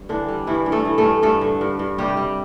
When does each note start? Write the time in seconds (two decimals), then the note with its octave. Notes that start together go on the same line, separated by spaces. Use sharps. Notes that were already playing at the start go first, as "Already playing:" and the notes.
Already playing: G2 G3
0.09 D3 E3 D4
0.28 G3
0.47 G2 E3 E4
0.66 G2
0.72 A3 A4
0.85 E3
0.98 A3 A4
1.04 G2
1.22 G2 A3 A4
1.41 D3
1.61 G2
1.79 G2
1.98 C3 G3 G4
2.17 G3